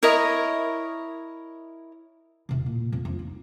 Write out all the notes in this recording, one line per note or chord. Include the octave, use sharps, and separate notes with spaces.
E4 A#4 C#5 D#5
E1 C3
A#2
F2
F2 D4
D#4